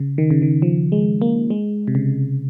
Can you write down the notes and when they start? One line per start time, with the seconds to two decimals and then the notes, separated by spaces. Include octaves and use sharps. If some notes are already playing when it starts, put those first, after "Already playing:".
Already playing: C#3
0.18 D#3
0.30 C#3
0.42 D#3
0.62 F3
0.92 G#3
1.22 A#3
1.50 G#3
1.88 C3
1.95 C#3